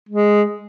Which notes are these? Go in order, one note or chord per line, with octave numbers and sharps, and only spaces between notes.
G#3